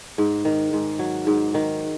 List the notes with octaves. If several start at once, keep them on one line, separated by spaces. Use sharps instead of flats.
G#2
D#3
G#2
F#3
G#2
D#3